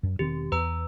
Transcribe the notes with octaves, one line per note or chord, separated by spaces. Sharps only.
F#2
E1 D#3 C4 G4
E2 B4 A#5 E6